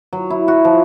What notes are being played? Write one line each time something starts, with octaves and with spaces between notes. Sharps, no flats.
F#3
E4
F#4
F3